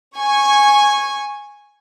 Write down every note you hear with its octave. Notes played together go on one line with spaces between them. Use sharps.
G#5 C#6 G#6